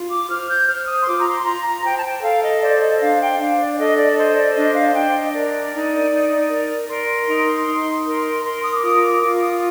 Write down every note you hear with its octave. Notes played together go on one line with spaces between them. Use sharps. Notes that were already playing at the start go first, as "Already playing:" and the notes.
Already playing: F4
D6
C5 F6
G6
C5 F6
D#6
C6
F4 D6
A#5
C6
C6
F4 A#5
A#5
C5 G5
A5
G5
A4 F5
D#5
C5 D5
D#5
D4 F5
G5
D4 F5
D5
D5
A4 D#5
D5
C5 D#5
D5
D4 D#5
F5
D4 G5
D#5
A#4 D5
D#4
D#4
A#4
A#4 C6
D#4
D#4
A#4
A#4 C6
D#6
D6
F4 D#6
D6
F4 D6
D#6